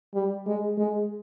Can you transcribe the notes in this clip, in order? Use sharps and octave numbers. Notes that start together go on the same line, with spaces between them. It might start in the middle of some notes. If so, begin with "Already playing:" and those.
G3
G#3
G#3